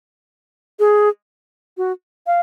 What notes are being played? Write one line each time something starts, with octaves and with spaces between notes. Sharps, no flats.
G#4
F#4
F5